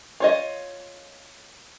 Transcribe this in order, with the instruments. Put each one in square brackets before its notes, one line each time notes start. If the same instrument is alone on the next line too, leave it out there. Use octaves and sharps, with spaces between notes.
[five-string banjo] F4 C#5 D#5